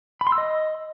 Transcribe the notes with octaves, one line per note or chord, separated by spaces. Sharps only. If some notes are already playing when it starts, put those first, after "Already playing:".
B5
C6
E6
D#5